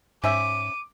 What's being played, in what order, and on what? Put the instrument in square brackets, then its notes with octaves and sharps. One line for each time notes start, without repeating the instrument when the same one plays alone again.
[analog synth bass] G#2 [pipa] C#4 C5 E5 [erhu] D6 [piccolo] D#7